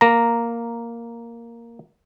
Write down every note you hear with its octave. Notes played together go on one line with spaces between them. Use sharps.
A#3 A#5